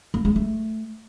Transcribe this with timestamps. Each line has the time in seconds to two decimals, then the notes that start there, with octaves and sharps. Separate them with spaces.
0.14 A#3
0.25 G#3
0.36 A3